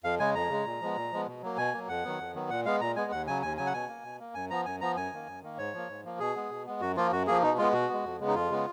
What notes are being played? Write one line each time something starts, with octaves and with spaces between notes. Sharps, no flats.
F2 F5
C#3 G#3 G#5
F2 A#5
C#3 G#3
A#2
F3 G#3 B3
A#2
F3 G#3 B3
B2
F#3 A#3
B2 G#5
F#3 A#3
F2 F#5
D#3 F#3 B3
F2
D#3 F#3 B3
A#2 F#5
G#3 B3 F5
A#2 A#5
G#3 B3 G#5
D#2 F#5
C#3 F#3 G#5
D#2 G#5
C#3 F#3 G#5
F#5
B2 G#5
A#3
B2
A#3
F#2 G#5
F3 B3 A#5
F#2 G#5
F3 B3 A#5
F#2 G#5
D#3 A#3
F#2
D#3 A#3
G#2 C#5
F3 A#3
G#2
F3 A#3
B2 G#4
G#3 B3
B2
G#3 B3
F#2 F#4
F3 A#3 F4
F#2 F#4
F3 A#3 G#4
B2 D#4
G#3 B3 F4
B2 F#4
G#3 B3
F2
C#3 G#3 B3
D#4
F2 F4
C#3 G#3 B3